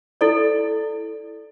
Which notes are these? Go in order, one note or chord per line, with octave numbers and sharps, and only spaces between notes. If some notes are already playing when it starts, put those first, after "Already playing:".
E4 A4 D5